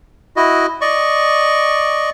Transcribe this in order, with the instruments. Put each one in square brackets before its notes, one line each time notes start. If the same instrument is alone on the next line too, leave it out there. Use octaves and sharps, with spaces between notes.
[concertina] E4 F#4 D#5
D5 D#5 C#6